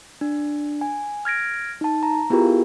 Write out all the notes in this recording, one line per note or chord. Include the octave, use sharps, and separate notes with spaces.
D4
G#5
F6 G#6 A#6 D7
D#4 A5
A#5
B3 E4 F4 G4 G#4 A#4